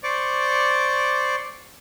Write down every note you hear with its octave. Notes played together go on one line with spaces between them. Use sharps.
C5 D5 C#6 D6